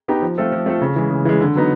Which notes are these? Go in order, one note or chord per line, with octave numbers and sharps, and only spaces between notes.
B3 D#4 G4
F3
A3 C4 F4 A4
F3
A3 C4 F4 A4
C#3
E3 G#3
C#3
E3 G#3
D3
F#3 B3 D#4